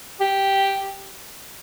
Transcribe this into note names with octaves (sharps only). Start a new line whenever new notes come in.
G4